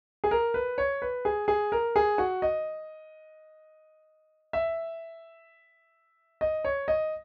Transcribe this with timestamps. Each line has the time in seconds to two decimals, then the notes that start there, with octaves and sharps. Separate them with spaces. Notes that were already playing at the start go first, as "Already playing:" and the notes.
0.24 G#4
0.31 A#4
0.54 B4
0.78 C#5
1.02 B4
1.25 G#4
1.48 G#4
1.72 A#4
1.96 G#4
2.18 F#4
2.42 D#5
4.53 E5
6.41 D#5
6.65 C#5
6.88 D#5